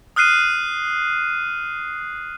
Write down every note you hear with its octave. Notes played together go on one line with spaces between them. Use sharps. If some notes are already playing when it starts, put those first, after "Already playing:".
D#6 F6 F#6 C7 D#7